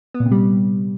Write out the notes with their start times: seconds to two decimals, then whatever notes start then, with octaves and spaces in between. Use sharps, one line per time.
0.14 B3
0.20 A#2
0.26 C3
0.31 G3